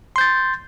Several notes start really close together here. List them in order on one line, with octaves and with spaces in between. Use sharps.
C6 G6 A6